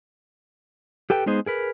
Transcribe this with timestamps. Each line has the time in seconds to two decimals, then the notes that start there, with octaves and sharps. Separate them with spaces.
1.10 G4 A4 B4 G5
1.26 G#3 B3 D#4 G#4 C5 D#5
1.46 G#4 A#4 B4